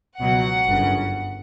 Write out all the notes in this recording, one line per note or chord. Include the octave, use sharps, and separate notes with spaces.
C#2 B2 F#3 F#5
G1 F#2 C#3